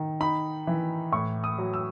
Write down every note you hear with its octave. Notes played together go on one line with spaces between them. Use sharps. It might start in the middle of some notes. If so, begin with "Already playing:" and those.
Already playing: D#3
D#4 B5
E3
A2 C#6
D#6
F#3
E6